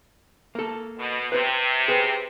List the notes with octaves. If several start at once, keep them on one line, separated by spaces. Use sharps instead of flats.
A#3 A4
B2
C3 B4 C5
G#4 B4